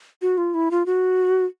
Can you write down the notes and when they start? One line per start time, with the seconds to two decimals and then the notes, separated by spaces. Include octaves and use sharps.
0.22 F#4
0.38 F4
0.54 E4
0.71 F4
0.86 F#4